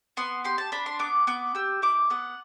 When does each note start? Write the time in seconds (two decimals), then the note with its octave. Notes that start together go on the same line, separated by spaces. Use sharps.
0.17 B3 C6
0.44 G4 C6
0.58 A5
0.72 D4 B5
0.86 C6
0.99 B3 D6
1.27 B3 D6
1.55 G4 E6
1.82 E4 D6
2.10 B3 F#5